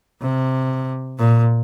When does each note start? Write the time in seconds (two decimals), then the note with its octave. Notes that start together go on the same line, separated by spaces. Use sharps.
0.21 C3
1.18 A#2